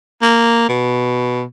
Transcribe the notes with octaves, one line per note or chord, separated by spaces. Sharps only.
A#3
B2